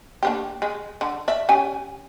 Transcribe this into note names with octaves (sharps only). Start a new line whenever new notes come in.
A#3 D4 G4
G#3
D3
D5 E5
C#4 G4 G#5